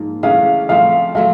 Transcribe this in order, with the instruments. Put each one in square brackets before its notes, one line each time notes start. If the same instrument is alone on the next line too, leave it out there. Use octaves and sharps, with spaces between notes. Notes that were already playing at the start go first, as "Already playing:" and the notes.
Already playing: [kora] G#2 F3 A#3
[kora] C#3 E3 A3 D4 [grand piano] F5
[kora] F3 A3 C4 [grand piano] F5
[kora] F#3 A3 C4 [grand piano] F5